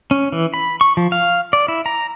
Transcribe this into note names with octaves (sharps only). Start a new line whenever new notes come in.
C#4
E3
B5
C#6
F3
F5
D5
E4
A#5